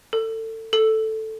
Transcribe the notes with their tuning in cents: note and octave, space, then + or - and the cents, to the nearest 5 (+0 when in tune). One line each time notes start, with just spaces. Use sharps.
A4 +25
A4 +0